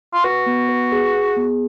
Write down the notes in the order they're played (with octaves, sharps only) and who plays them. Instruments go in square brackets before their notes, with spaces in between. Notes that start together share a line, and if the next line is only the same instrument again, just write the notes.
[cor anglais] F4
[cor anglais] F#4 [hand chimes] B4
[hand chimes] B3
B4
G#4
G#4
B3